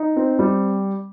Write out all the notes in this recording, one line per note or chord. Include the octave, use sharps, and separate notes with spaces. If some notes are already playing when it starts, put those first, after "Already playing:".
Already playing: D#4
C4
G3